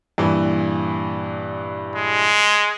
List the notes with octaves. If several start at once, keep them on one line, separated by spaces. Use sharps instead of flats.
G2 A#2 E3
G#3